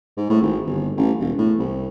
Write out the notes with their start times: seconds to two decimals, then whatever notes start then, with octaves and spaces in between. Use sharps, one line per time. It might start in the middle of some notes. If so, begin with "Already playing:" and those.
0.17 G#2
0.30 A2
0.42 G#1
0.66 G1
0.97 A1
1.20 E1
1.38 A2
1.59 C2